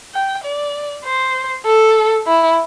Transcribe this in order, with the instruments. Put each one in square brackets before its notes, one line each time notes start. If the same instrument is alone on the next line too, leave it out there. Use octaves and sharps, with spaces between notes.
[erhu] G5
D5
C5
A4
E4